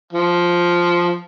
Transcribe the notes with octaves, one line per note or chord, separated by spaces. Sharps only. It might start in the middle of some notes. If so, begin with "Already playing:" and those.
F3